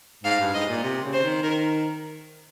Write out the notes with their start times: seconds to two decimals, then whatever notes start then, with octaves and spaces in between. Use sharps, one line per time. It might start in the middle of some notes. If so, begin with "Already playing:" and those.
0.24 G#2 F5
0.40 G2
0.53 G#2 D#5
0.68 A#2
0.83 C3
1.04 C#3
1.13 C5
1.23 D#3
1.42 D#3 A#4